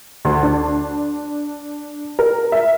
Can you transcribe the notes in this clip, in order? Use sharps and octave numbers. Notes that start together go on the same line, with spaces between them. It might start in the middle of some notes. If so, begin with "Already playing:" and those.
D2
D4
A#4
E5